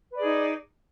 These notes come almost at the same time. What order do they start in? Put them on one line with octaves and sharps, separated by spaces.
B4 D5 G#4 D#4